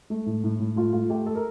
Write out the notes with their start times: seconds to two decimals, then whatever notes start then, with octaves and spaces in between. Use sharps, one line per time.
0.10 A3
0.26 A2
0.44 A2
0.60 A2
0.76 A3 F4
0.93 A3 F4
1.10 A3 G4
1.26 A4
1.35 A#4